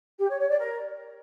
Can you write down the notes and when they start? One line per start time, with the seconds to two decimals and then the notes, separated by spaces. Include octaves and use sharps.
0.18 G4
0.28 C#5
0.39 C#5
0.49 D5
0.59 A#4